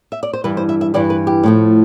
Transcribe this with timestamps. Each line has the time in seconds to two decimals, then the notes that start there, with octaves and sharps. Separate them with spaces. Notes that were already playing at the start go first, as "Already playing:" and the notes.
0.12 E5
0.23 D5
0.33 C5
0.44 G2 E3 G3 B4
0.57 C5
0.69 E5
0.81 E5
0.94 G2 E3 G3 D5
1.10 B4
1.27 G4
1.43 A2 F3 A3